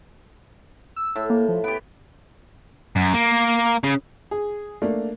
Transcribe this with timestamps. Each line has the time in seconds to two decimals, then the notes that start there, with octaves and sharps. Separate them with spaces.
0.96 E6
1.16 A2
1.30 A#3
1.49 F3
1.64 B3 G4 D7
2.96 F#2
3.14 A#3
3.84 C#3
4.31 G#4
4.82 A3 A#3 D4